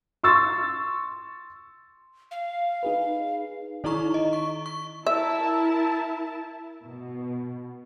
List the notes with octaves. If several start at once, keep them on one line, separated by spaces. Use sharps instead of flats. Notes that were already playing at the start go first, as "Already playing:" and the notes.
C6 C#6 E6 A6
F5
D#4 G#4 B4
D#3 D#4 E4 A#5 C#6
D#5
C#6
C#6
E4 A#4 E5 A5
B2